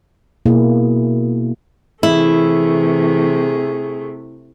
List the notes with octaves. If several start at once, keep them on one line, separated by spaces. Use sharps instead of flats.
B2 A#3 E4 G#4
C3 E3 A3 E4 G#4